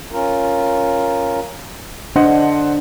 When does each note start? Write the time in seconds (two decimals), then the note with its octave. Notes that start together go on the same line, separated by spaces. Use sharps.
0.12 C#4 F4 A#4
2.16 D3 D4 C5 D#5 F#5